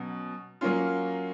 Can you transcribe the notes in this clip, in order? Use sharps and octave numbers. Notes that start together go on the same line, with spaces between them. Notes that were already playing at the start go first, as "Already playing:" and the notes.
Already playing: B2 F#3 C#4
F#3 A#3 C#4 F4